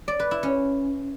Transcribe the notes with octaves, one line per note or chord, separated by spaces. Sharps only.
D5
B4
E4
C#4